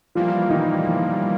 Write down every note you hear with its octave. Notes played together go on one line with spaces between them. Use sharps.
E3 F3 G3 A#3 F4
D#3 D#4
F3 F4